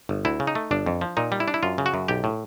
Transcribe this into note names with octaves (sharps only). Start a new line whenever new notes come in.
G1
D2 E4
C#3
D#4
A3
G1 D4
F2
F3
A#2 D#4
G3
E4
D4
E4
F#2 F4
C#3
F#4
F#2
B1 G4
A2